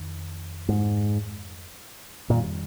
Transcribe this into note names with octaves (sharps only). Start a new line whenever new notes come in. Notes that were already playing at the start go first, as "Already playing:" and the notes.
Already playing: F2 D#3
G#2
F2 A#2 D#3 G3